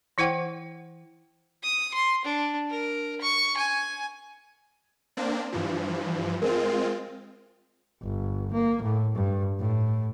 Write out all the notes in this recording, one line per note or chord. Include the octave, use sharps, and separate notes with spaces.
E3 E4 C5 F#5 G5
D#6
C6
D4
A#4
C#6
G#5
A#3 C4 D4
G2 E3 F3
G#3 C4 F4 A#4
G1
A#3
A2
G2
A2